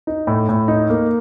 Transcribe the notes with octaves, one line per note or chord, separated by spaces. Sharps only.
D#4
A2
A2
D#4
A#3